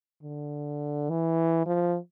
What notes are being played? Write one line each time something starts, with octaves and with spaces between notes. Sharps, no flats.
D3
E3
F3